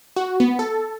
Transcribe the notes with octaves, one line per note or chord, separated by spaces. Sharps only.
F#4
B3
A4